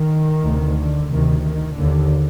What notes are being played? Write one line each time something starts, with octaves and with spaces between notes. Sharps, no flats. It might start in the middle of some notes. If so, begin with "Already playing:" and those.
Already playing: D#3
D2 C3
D3
D2 C3 D#3
D#3
D#2 D3